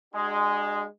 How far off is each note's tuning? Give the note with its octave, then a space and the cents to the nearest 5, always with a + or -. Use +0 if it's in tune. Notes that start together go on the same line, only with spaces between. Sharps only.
G#3 -5 D4 +35 F#4 +40